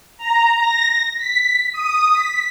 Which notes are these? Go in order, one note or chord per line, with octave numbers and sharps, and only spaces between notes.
A#5
A#6
B6
D#6
B6